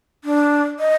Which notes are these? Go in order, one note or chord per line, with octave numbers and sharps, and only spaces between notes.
D4
D#5